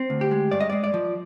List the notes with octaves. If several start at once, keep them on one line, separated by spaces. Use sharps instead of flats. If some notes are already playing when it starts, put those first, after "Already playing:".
Already playing: C4
D2
G4
G#3
G2 D5
D#5
G#3 D5
D5
F3